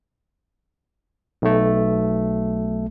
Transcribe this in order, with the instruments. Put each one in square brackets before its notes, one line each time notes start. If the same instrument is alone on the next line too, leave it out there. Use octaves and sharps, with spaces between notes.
[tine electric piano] B1 A3